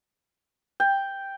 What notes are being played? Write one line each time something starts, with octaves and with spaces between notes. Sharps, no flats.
G5